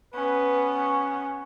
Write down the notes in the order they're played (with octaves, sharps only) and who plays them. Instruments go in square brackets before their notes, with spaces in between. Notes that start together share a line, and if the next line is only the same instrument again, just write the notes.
[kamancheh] B3 C#4 [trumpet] B4
[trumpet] C#6